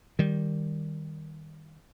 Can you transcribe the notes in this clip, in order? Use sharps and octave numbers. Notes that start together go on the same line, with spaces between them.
D#3 G3